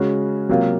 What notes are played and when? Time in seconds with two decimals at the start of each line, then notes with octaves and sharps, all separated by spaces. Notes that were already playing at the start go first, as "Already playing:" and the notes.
Already playing: C#3 G#3 C#4 F#4
0.49 C3 F#3 A#3 F4